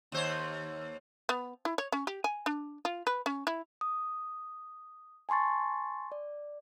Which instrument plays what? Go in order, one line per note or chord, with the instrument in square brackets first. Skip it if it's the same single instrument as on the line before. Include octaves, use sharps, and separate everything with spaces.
[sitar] D#2 C5 C#5
[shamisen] B3
E4
C#5
C#4
G4
G#5
D4
F4
B4
C#4
E4
[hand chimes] D#6
G#5 A5 C6 C#6 A6
D5